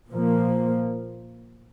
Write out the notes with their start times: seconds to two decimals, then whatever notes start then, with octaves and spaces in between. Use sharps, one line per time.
0.10 A#2 F3 A#3